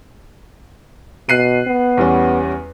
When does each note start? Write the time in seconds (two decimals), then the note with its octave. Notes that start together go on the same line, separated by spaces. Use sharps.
1.29 B2 F#6 C7 D#7
1.67 B3
1.97 E2 G3 C#4